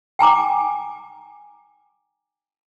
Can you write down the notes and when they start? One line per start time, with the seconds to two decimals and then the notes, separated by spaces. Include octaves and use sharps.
0.19 G5 G#5 A#5 D6